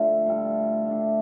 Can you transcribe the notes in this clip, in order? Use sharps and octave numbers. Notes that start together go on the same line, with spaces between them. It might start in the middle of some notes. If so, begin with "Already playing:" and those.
Already playing: D3 F3 A3 F4 A4
A2 G3 F4 A4
A2 A3 D4